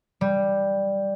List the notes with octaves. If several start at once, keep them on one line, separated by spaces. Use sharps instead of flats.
G3